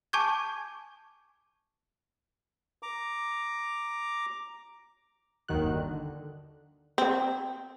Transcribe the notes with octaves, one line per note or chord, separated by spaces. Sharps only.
G#5 A5 C#6 D6 G6 G#6
A#5 D6
G1 D#2 D#3 F#4 F#6
D3
C4